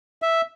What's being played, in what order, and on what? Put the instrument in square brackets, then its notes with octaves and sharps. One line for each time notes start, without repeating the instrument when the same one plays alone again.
[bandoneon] E5